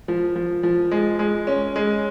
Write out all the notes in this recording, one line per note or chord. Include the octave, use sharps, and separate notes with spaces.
F3
F3
F3
G#3
G#3
C#4
G#3